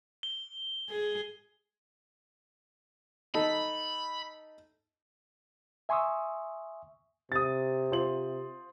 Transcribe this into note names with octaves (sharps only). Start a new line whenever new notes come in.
G7
G#4
D#4 A4 B5
E5 G#5 C6 C#6 D#6 E6
C3 D#6 A6
F4 C5 F#7